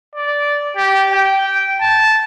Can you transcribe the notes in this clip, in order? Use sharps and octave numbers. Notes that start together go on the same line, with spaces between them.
D5
G4
G5
A5